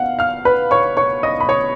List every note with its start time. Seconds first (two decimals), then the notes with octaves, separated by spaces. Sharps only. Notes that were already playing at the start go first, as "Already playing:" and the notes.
Already playing: B2 F5 F#5
0.19 F5 F6
0.45 B4 B5
0.71 C#5 C#6
0.97 C#5 C#6
1.23 D#5 D#6
1.40 B5
1.49 C#5 C#6